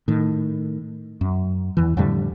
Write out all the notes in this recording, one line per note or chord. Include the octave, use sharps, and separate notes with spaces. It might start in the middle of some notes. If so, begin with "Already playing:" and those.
A2 D#3
F#2
E2 E3
F2 A2 D3 G3